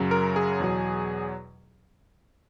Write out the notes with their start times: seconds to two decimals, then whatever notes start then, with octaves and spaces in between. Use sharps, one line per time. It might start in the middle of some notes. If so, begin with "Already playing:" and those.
Already playing: F#2 C#3 F#3
0.11 A#4
0.36 G#4
0.60 E2 B2 F#3